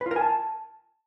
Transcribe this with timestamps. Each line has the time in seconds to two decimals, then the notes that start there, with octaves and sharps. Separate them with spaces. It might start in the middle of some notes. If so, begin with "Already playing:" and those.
0.01 B4
0.06 F4
0.11 A#4
0.16 G#5
0.21 A5